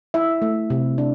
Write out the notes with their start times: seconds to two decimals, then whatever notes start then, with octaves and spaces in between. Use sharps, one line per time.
0.14 E4 E5
0.42 A3
0.70 C3
0.98 D4